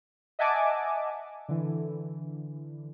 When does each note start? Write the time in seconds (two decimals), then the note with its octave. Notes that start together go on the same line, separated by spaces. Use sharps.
0.39 D#5 E5 F#5 G#5 A5 D6
1.49 D3 E3